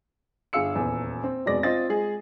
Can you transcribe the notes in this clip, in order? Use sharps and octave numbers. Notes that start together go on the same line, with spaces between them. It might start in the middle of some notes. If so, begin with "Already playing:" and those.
G1 G#4 F5 E6 C#7
D#1 E2
C4
F1 B2 G#3 D5 A#6
C4 F4 D#5 A6
G#3 G#4